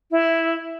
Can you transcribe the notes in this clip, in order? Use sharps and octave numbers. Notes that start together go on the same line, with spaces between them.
E4